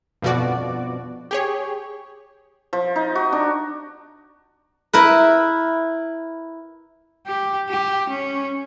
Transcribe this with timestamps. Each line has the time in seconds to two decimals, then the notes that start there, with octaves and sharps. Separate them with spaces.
0.22 G1 F2 B2 F3 F#4 D5
1.31 G4 G#4 C#5
2.73 F3
2.96 D#4
3.15 F#4
3.32 D4
4.93 E4 A#4 B4
7.27 G4
7.69 G4
8.09 C#4